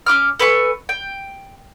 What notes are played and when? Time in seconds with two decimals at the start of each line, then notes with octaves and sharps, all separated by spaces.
0.06 C#4 E4 D6 F6
0.39 A4 B4 G#5 C#6
0.89 G5